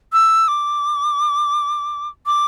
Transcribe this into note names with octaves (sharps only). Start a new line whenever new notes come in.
E6
D6
D6